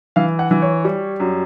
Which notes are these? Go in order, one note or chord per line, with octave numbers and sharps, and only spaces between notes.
E3 F5
F#5
E3
C#5
G3
F#2